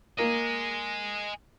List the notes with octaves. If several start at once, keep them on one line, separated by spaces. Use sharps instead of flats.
A#3 D#5 G#5